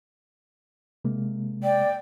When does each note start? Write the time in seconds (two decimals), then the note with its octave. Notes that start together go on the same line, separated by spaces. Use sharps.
1.05 C3 G#3 A#3
1.63 D5 G5